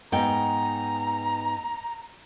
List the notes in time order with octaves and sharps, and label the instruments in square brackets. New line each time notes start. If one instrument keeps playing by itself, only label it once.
[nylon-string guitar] G#2 B3 G5 [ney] A#5